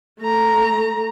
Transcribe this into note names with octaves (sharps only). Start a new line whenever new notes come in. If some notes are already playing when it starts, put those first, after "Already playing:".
A3 A#5